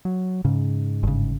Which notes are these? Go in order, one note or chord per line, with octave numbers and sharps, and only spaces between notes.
F#3
G#2 C#3
G1 C#3